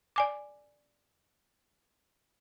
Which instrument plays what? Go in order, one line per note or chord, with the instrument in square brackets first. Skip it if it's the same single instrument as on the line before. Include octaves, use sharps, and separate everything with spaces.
[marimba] D5 G#5 D6